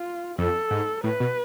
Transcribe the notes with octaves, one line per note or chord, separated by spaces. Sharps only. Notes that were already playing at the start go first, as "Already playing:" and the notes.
Already playing: F4
F2 A4
G#2
A2 B4
B2